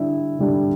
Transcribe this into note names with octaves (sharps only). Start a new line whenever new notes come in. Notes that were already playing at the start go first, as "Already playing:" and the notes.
Already playing: D3 G3 D4 E4
D3 G3 D4